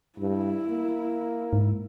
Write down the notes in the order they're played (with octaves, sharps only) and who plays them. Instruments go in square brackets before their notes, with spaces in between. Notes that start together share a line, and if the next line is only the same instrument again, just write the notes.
[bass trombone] G2 [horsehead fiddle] E4
[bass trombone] A#3
[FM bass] G#2